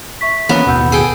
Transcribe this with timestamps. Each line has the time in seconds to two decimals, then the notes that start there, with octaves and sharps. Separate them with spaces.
0.21 E5 C#6 B6
0.49 E3 A#3 B3 C#4
0.67 A1 D#2 B2 F#5 E6 G6
0.92 G#4 A4 G5